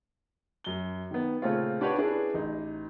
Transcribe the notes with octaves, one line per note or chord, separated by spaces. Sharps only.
F#2 G7
D#3 B3
A#2 C#3 A3 C4 C#4 F4
D4 F#4 G4 B4 C#5 D5
C#4 D4 E4 G#4 B4
A1 D#4